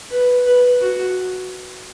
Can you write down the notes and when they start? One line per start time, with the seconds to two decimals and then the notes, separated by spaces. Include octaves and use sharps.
0.10 B4
0.46 B4
0.80 F#4